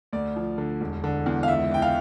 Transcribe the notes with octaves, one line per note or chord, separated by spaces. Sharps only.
D2 D5
F3
D3
E1
D3
E2
F5
C#2 E5
E3 G5
F5